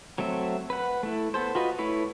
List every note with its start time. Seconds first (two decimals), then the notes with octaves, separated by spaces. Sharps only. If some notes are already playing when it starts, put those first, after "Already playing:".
0.18 F#3 A3 C4 E5
0.70 B4 F#5
1.03 A3 E4
1.34 B3 A4 C5
1.55 F4 F#4 B4 D#5
1.79 A3 E4 B4 C#5